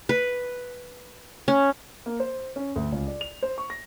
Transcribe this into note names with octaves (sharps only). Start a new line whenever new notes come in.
B4
C#4
A#3
C5
C#4
D2
C#2
D5
F7
C5
C#6
A#6